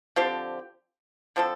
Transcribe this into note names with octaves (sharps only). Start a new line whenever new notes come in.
D3 F3 C4 G4
D3 F3 C4 A4